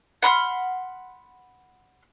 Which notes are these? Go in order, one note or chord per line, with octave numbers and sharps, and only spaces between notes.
F#5 B5 C6 F6